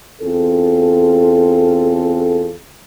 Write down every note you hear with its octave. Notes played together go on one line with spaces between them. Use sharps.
E2 C4 F4 G#4 A4